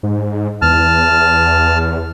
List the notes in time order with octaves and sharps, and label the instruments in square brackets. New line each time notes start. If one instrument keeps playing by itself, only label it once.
[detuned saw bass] G#2
[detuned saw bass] E2 [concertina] A5 F6